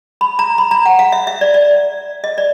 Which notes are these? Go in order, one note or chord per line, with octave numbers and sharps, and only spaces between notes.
B5
A#5
B5
A#5
F#5
F5
E5
E5
D5
D5
D#5
D5